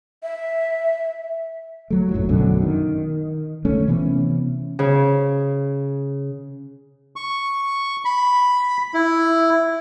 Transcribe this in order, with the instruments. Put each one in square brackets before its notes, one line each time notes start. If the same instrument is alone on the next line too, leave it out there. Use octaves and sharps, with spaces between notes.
[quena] E5
[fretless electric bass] F#3 A3
A#1 F#2 A2 F#3
A#1 F#2 B2 D3
D#3
D2 A3 C#4
C3 E3 B3 C#4
[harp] C#3
[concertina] C#6
B5
E4